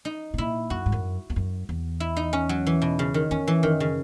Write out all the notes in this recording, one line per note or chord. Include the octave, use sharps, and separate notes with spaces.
D#4
B2
A#2 E4
F#2 F#4
G#2
F#2
E2
F#2
E2
E4
D#4
C#4
F#3
E3
B2
C#3
D#3
E2 C#4
E3
F#2 D#3
C#3